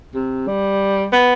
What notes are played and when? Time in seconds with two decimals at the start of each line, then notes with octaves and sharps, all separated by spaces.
0.15 C3
0.47 G3
1.13 B3